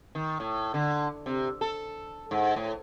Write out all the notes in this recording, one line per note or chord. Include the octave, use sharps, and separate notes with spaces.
D#3
A2
D3
C3
A4
G#2
A2